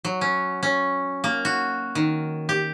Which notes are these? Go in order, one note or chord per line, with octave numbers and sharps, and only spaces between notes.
F#3
C#4
C#4
A#3
F#4
D#3
G4